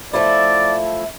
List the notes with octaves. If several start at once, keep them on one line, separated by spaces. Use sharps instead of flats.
F3 A3 E4 D5